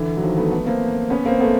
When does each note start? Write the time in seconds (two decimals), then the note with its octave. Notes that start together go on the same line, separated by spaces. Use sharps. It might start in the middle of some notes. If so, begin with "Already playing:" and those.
Already playing: D3 E3
0.17 F#3
0.22 D#3 F3
0.37 A3 B3
0.51 A3 B3
0.66 A#3 C4
1.10 B3 C#4
1.25 A#3 C4
1.41 A3 B3